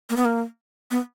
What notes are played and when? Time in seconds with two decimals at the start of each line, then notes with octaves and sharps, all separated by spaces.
0.10 A#3
0.17 B3
0.25 A#3
0.91 B3